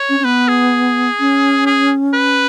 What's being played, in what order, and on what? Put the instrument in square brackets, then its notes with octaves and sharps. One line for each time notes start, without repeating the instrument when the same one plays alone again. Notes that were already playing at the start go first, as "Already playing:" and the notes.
Already playing: [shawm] C#5
[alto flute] C#4
C#4
[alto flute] B3 [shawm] B4
[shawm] G#4
[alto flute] C#4
[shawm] G#4
B4